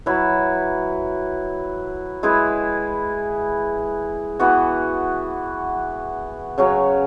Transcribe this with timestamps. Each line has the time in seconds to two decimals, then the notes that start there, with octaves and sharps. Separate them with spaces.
0.06 F#3 E4 B4
2.23 G#3 E4 G#4 B4
4.39 E3 B3 F#4
6.58 C#3 F#3 C#4